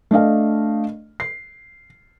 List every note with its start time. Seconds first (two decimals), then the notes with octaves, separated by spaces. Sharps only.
0.11 A3 D4 D#5 F5
1.20 C7